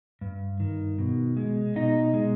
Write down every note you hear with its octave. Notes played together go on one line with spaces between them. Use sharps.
G2
D#3
B2
G#3
B2 D#4
G#3